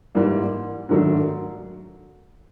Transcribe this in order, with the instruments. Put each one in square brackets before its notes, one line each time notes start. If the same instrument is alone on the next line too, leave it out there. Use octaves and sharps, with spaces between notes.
[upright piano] G#2 E3 G3 A#3
G#2 D#3 F#3 A3 D4